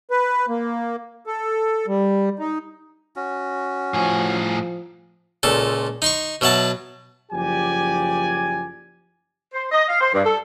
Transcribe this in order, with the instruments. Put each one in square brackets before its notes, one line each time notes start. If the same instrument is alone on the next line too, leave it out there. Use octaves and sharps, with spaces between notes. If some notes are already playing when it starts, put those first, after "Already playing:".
[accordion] B4
A#3
A4
G3
D#4
[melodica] C#4 F#4
[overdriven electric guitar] A2 G#4 [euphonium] F3
[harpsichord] C#2 A#2 A4
D#4 C6 C#6
B2 F#3 E5 F#5 A5
[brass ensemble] F#1 F3 G4 D5 G#5
[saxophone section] C5
D#5
F5
C5
G2
A4